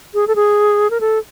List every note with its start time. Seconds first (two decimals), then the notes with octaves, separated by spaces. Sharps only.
0.14 G#4
0.28 A4
0.36 G#4
0.90 A#4
1.01 A4